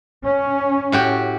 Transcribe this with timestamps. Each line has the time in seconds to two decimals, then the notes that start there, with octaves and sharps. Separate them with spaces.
0.24 C#4
0.92 A2 F#4 G4